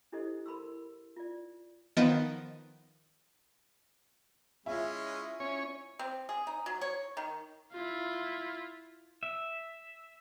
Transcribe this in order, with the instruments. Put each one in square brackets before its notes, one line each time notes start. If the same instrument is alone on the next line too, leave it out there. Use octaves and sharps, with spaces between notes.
[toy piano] D4 E4 G4 A4 C5 D#5
A#4 B5 C6 E6
F4 D5
[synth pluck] D#3 F3 B3 D#5 A6 D7
[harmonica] G#3 C#4 [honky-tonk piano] E4 F4
[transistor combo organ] C#4 C#5
[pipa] C4
G#4
D#4
F#3
C#5
D#3
[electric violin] E4 F4
[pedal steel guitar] E5